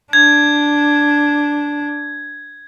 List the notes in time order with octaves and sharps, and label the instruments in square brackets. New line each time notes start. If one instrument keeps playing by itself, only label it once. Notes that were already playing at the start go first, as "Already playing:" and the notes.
[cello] D4 [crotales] G#6